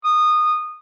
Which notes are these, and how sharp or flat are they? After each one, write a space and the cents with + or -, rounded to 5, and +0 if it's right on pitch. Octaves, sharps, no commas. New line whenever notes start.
D#6 -20